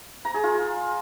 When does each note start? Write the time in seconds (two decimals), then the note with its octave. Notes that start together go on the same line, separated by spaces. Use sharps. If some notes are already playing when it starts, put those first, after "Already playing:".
0.25 A#5
0.34 G#4
0.44 F4